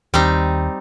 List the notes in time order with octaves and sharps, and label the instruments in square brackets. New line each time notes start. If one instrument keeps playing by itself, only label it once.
[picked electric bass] D#2 [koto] G3 C4 D#4